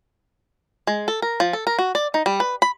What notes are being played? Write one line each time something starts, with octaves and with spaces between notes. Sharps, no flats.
G#3
A4
A#4
F3
A4
A#4
F#4
D5
D#4
G3
B4
B5